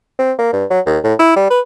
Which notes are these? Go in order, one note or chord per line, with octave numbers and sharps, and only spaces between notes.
C4
A#3
G2
F#3
D#2
A2
E4
G3
B4